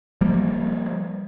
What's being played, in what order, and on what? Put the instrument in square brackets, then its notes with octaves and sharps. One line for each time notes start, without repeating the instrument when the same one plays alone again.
[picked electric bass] F3 G3 A#3